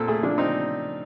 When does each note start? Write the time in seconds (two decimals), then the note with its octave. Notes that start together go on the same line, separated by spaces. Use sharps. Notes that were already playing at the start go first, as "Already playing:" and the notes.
Already playing: A#2 C4 A4
0.08 A3 G#4
0.23 F3 D4
0.38 C4 D#4